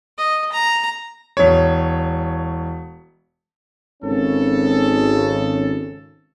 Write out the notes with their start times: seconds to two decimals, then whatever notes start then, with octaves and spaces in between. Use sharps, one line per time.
0.18 D#5
0.52 A#5
1.37 E1 C#5
4.03 G#1 C#3 C#4 A4